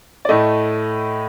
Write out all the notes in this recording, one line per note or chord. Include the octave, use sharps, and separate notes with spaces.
D5
A2 A3 D#5